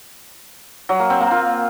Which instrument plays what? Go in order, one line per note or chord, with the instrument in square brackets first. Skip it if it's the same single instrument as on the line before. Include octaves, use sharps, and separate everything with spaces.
[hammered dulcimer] F#3
A#3
C4
A#3
F4